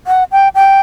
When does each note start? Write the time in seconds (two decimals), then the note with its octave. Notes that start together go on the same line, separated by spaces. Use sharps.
0.07 F#5
0.32 G5
0.55 G5